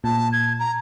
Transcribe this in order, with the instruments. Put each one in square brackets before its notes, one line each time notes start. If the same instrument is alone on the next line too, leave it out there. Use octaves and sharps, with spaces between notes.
[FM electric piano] A#2 [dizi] A5
[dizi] G#6
A#5